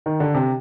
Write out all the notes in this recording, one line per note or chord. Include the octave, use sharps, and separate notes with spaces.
D#3
D3
C3